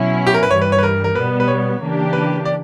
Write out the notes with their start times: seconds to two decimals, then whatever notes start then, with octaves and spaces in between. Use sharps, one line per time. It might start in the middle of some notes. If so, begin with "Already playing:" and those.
Already playing: B2 F#3 C#4 E4
0.27 G4
0.34 A#4
0.43 B4
0.50 G2 C#5
0.53 E3 G3
0.61 B4
0.72 C#5
0.78 B4
0.83 A#4
1.04 A#4
1.15 B2 G3 B3 B4
1.40 B4
1.48 C#5
1.81 C#3 E3 A#3 D4 G4
2.13 B4
2.45 D5